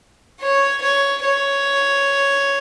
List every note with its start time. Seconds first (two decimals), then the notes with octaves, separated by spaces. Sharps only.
0.42 C#5
0.82 C#5
1.23 C#5